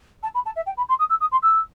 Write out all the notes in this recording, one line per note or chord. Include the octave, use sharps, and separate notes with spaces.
A5
B5
A5
E5
G5
B5
C6
D#6
E6
D#6
C6
E6